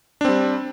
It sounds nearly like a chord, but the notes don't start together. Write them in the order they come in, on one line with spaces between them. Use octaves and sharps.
D4 C4 G3